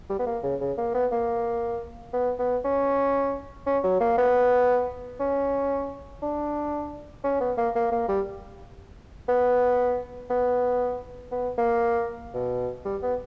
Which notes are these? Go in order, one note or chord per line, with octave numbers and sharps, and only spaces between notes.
G3
B3
A#3
C#3
C#3
A#3
B3
A#3
B3
B3
C#4
C#4
F#3
A#3
B3
C#4
D4
C#4
B3
A#3
A#3
A#3
G3
B3
B3
B3
A#3
B2
G3
B3